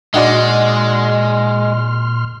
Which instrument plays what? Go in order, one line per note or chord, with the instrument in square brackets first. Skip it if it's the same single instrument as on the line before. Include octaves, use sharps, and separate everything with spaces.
[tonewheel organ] A#2 C6 F6 [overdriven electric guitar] G#3 [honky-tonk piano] D#4 F#4 D5